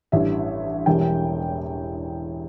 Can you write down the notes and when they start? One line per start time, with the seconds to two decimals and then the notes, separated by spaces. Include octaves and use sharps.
0.12 A1 G2 E3 G3 E5
0.86 E1 E2 E3 G3 G5